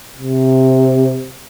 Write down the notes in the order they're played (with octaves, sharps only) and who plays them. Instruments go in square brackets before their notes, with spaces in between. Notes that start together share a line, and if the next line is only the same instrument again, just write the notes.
[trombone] C3